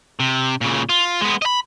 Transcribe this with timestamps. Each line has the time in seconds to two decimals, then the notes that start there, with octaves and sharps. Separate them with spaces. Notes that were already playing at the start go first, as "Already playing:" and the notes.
0.20 C3
0.61 A#2 C#3
0.89 F4
1.21 G#3 B3
1.42 D#5 B5